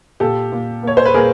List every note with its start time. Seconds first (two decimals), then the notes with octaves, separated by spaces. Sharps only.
0.20 A#2 G4 A4
0.52 A#2
0.83 A#3 C#5
0.97 C5
1.05 B4
1.14 A#2 G#4 A#4